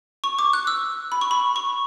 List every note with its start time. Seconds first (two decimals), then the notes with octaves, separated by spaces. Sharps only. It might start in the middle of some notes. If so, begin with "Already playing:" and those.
0.24 C#6
0.39 D6
0.53 F#6
0.67 E6
1.12 B5
1.21 C#6
1.31 B5
1.56 C#6